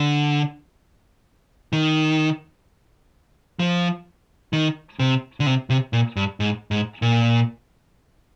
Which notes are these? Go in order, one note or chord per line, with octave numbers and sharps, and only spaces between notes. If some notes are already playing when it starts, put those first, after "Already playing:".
Already playing: D3
D#3
F3
D#3
C3
D3
C3
C3
A#2
G2
G#2
G#2
A#2